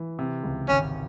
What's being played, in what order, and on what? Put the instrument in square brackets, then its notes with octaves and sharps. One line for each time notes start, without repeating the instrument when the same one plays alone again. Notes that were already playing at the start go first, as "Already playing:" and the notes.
Already playing: [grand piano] E3
C3
C#2
[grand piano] G#1 [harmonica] C#4